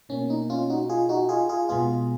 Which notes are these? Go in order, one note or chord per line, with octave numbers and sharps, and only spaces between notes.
B2 A#3 C#4
D#4
C#4 F4
D#4 F#4
F4 G#4
D#4 F#4
F4 G#4
F4 G#4
B2 G#3 B3 F4 G#4